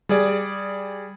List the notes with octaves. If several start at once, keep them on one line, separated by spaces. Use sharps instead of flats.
G3 G#4 D5